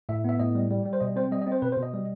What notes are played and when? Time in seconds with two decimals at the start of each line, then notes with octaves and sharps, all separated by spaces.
0.09 A2 E5
0.24 B3 E5
0.40 A2 D#5
0.55 G3
0.71 G3
0.86 G3
0.93 C5
1.01 B2 D#5
1.16 C4 C5
1.31 G3 D#5
1.42 D#5
1.47 C4
1.52 C5
1.62 B2 B4
1.72 C5
1.77 B2
1.83 D#5
1.93 G3